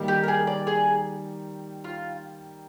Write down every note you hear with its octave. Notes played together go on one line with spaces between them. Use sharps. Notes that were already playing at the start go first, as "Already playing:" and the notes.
Already playing: D#3 G3 A#3 D#4
G4
A#4
G#4
D5
G#4
F4